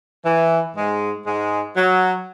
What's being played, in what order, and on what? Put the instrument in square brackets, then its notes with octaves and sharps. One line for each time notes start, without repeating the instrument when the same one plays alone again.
[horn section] E3
G#2 G#3
G#2 G#3
F#3